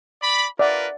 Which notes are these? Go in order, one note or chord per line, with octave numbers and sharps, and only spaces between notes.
D5 B5
F4 A#4 B4 D5 E5 F#5